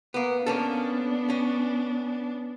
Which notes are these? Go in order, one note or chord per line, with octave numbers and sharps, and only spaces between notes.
A#3 B3
A#3 B3 C#4 D4 A4
C#4